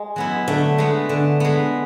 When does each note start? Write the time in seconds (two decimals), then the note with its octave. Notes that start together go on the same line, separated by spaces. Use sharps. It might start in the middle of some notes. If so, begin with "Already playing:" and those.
Already playing: G#3
0.16 F#3 B3 E4
0.48 D3 A3
0.78 G#3 B3
1.09 D3
1.40 G#3 B3